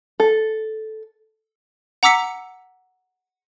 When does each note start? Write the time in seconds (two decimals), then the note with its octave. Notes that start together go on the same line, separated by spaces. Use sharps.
0.20 A4
2.03 F#5 A#5 D6 E6 B6 C#7